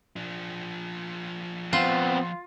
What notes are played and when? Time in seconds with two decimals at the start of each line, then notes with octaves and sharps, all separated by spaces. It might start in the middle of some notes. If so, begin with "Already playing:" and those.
0.16 F3 D4
1.73 B3 C4 F4